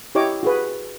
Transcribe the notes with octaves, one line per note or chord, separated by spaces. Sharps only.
E4 G4 C#5 D#5 D6
F#4 G#4 B4